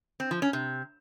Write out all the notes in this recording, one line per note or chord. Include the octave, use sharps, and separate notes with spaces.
C4
F3
C#4
C3